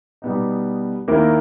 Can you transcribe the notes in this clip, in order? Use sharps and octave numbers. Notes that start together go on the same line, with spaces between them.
B2 G3 B3 D#4
D#2 D#3 A#3 E4 A#4